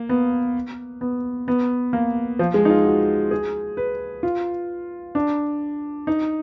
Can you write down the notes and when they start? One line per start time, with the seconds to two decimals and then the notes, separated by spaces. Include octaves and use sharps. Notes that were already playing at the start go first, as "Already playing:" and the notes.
Already playing: A#3
0.09 B3
1.01 B3
1.48 B3
1.93 A#3
2.39 F3
2.54 G#3
2.65 D#4
2.69 F4
2.85 F#4
3.31 G#4
3.77 B4
4.23 F4
5.15 D4
6.07 D#4